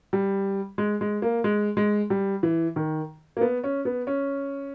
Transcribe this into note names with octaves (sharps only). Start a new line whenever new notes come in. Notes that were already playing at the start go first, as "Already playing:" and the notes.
G3
G#3
G#3
A#3
G#3
G#3
G3
E3
D#3
A#3
B3
C#4
B3
C#4